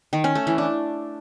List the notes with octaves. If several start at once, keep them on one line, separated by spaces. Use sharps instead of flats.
D#3
C#4
A3
E3
D4